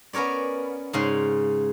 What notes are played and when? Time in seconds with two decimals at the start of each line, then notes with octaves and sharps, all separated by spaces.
0.13 B3 C#4 A#4 C#5 D5
0.93 G#2 C#3 F5 C6